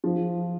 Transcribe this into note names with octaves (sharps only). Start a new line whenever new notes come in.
F3